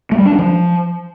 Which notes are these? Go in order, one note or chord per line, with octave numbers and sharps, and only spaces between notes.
A3
G3
D4
G3
F3